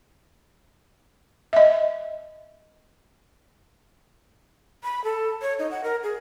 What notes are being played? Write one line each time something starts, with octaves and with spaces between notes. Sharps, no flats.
D#5 E5
B5
A4
C#5
D#4
F#5
A#4
G#4